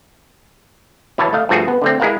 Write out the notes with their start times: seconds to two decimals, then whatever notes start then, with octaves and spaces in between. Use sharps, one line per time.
1.18 B2 E3 B3 B4 C#5 A5
1.33 A3 D#5 F5
1.49 G2 F3 A3 F#4 G#4 A4
1.68 B3
1.82 D3 A3 C4
2.00 G#3 E4 G#4 A#4 F5 F#5